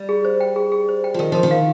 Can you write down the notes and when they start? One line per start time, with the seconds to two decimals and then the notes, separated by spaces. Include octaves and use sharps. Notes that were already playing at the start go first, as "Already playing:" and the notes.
Already playing: G3
0.09 G#4
0.25 C5
0.41 G5
0.56 G#4
0.72 G#4
0.89 C5
1.04 G5
1.14 F3
1.19 D#3 A#4
1.32 F3 A#4
1.43 D#3
1.51 F5